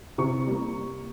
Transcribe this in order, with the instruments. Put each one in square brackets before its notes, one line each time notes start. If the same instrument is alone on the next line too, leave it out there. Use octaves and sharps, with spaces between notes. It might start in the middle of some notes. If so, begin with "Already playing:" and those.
[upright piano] C3 C#6
G3 A#3